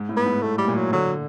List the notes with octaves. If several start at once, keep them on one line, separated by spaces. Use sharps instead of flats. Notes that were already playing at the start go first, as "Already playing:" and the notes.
Already playing: G#2
A2
B3
G#2
A2 A3
G3
A#2
F#3
D3 F#3